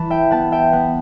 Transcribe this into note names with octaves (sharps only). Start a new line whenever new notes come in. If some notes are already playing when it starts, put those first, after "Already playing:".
Already playing: E3 A5 B5
E5 G5
B3 F#5 A5
E5 G5
B3 F#5